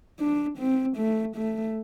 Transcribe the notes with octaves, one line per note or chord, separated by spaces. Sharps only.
D4
C4
A3
A3